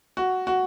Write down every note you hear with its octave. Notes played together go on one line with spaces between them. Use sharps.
F#4
F#4